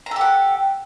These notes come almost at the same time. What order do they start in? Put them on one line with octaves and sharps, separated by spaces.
A#5 A4 G4 F#5